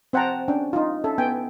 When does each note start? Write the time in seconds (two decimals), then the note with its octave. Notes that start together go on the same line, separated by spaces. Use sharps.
0.13 C4 C5 F#5 G5 A5 A#5
0.48 C#4 D4 G5
0.73 D#4 F4
1.04 C#4 A4 E5
1.18 B3 G5 G#5